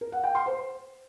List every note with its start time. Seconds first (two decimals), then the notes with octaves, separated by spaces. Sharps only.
0.01 A#4
0.12 F#5
0.24 G5
0.35 C6
0.46 C5